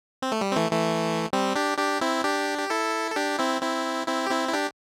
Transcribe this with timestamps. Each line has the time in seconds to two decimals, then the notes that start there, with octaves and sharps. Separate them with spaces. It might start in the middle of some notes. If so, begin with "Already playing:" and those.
0.22 C4
0.32 A3
0.41 G3
0.52 C4
0.56 E3 A3
0.71 E3 A3
1.33 G3 C4
1.55 D4 G4
1.78 D4 G4
2.01 C4 E4
2.24 D4 G4
2.58 G4
2.70 E4 A4
3.11 A4
3.16 D4 G4
3.39 C4 E4
3.62 C4 E4
4.07 C4 E4
4.27 G4
4.31 C4 E4
4.49 E4
4.53 D4 G4